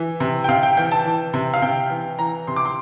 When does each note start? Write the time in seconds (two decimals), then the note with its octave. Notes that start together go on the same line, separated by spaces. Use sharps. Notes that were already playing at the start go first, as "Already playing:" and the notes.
Already playing: E3
0.20 C3
0.44 G5
0.48 C3 F5
0.63 G5
0.77 E3 G5
0.91 A5
1.05 E3
1.34 C3
1.54 F5
1.62 C3 G5
1.90 E3
2.19 E3 A#5
2.47 C3 C6
2.56 D6
2.66 C6